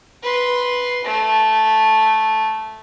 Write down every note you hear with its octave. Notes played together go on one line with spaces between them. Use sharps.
B4 C6
A3